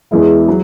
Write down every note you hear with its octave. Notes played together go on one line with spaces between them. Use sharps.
E2 E3 G#3 E4
F#3